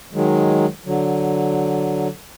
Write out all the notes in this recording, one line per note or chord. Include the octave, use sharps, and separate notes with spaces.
D#3 F#3 G#3
D3 F#3